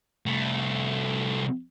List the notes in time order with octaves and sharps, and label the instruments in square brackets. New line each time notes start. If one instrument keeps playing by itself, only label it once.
[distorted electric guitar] C2 A3